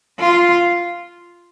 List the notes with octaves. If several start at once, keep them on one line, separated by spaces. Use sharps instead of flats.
F4